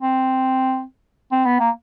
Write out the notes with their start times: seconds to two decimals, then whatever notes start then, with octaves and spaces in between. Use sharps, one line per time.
0.02 C4
1.32 C4
1.45 B3
1.60 A#3